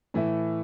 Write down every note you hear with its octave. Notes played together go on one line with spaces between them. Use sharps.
A2 E3 A3 E4